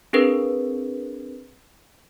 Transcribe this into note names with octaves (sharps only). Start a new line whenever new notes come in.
C4 D4 G#4 A#4 B4